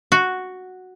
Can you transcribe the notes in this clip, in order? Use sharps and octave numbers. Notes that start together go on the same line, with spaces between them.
F#4